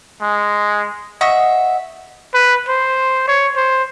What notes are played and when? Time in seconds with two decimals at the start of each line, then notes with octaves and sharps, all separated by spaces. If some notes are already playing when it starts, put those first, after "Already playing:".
0.22 G#3
1.21 D#5 E5 F#5 C#6
2.34 B4
2.68 C5
3.28 C#5
3.56 C5